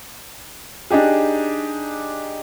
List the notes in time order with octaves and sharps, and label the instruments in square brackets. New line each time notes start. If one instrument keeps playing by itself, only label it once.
[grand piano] D4 D#4 G4 G#4